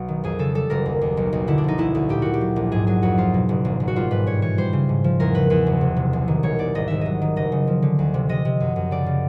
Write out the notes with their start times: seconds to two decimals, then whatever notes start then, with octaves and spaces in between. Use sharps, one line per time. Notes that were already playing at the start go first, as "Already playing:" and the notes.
Already playing: B1 F#4
0.08 D#3
0.24 F2 G#4
0.39 C#3 A4
0.55 G3 A4
0.70 F#1 A#4
0.86 D#2
1.01 D#2
1.17 B1
1.33 B1
1.47 D3 E4
1.58 D4
1.64 F3 D#4
1.78 D2 E4
1.95 D2
2.09 A#2 G4
2.22 A#2 F#4
2.34 G4
2.41 F#3
2.56 A#1
2.72 G#2 G#4
2.87 F#3 G#4
3.02 F2 F#4
3.18 F3 F4
3.34 B2
3.49 F#1
3.65 G#1
3.80 G#1
3.88 F#4
3.96 G3 F4
4.11 G#2 B4
4.27 G2 C#5
4.42 E3 C#5
4.58 G3 C5
4.73 C#3
4.89 G#2
5.04 F3
5.20 E2 A#4
5.35 C#3 B4
5.50 E2 B4
5.67 F#1
5.81 C3
5.97 C3
6.13 C2
6.28 D#3
6.43 E1 C#5
6.59 E1 D5
6.75 G#1 D#5
6.88 G#1 E5
7.01 F#3 D#5
7.22 D#3
7.36 F#1 D#5
7.52 C#3
7.67 F3
7.82 D3
7.99 D2
8.14 C3
8.29 C3 D#5
8.45 C3
8.60 F#2
8.76 F#2
8.91 C#3 D5
9.06 C#3